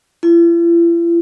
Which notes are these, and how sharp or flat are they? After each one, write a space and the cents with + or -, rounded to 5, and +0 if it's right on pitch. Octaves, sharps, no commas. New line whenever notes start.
E4 +45